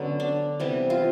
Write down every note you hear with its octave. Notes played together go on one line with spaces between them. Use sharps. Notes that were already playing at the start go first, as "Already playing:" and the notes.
Already playing: D3 F#3 B3 C#4
D4
C3 E3 G3 B3
F4